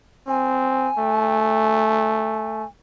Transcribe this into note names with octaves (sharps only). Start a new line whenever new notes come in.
C4 G#5
A3